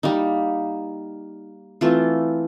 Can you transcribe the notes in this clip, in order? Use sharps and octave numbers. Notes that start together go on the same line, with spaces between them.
G3 A#3 D#4
E3 A3 C4 F4